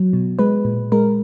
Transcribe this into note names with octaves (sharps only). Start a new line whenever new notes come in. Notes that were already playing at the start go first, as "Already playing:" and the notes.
Already playing: F#3
B2
G#3 B4
A#2
G#3 A#4